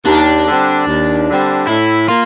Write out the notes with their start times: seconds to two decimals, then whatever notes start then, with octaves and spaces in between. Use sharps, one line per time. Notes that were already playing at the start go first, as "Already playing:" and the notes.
0.06 D#2 D4
0.46 D3 G3 C4
0.87 D#2
1.28 D3 G3 C4
1.68 A2 E4
2.08 A#3 F4